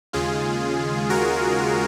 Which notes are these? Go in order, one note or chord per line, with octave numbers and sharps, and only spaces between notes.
D#2 C#3 G#3 F4 G#4
F#4 A#4